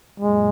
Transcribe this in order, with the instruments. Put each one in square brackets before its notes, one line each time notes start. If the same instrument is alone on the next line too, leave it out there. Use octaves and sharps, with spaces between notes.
[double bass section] F#2 A#2 [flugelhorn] G#3